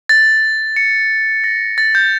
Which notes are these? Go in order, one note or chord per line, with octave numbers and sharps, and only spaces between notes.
A6
C#7
A#6
A6
G6